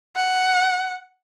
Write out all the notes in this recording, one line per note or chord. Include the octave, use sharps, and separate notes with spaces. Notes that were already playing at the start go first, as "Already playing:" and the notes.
F#5